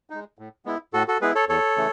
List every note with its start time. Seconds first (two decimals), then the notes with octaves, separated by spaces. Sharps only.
0.10 G#3 D#4
0.39 A2
0.65 G#3 B3 E4
0.93 A2 F#4 A4
1.08 F#4 A4
1.21 G#3 B3 E4 G#4 B4
1.35 A4 C#5
1.49 E2 A4 C#5
1.77 C#3 E3 A3